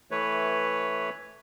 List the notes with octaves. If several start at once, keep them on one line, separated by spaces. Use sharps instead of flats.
E3 A3 B4 C#5